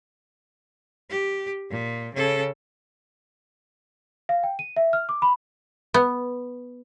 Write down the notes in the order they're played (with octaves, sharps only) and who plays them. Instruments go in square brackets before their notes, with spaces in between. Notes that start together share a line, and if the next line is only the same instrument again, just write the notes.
[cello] G4
A#2
C#3 A4
[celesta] F5
G5
D#7
E5
F6
D6
B5
[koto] B3